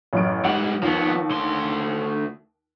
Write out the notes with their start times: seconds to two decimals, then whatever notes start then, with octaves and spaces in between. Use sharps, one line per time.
0.13 A1 F#2 D7
0.45 G#2 G3 F#5
0.83 D#2 F3 B3
1.30 D2 C6